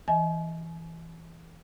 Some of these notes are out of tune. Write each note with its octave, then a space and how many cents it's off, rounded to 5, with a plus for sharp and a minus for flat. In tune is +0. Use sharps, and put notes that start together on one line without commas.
E3 +0 D#5 +20 G#5 +40